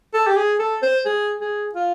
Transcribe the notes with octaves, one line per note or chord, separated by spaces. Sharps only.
A4
G4
G#4
A4
C5
G#4
G#4
F4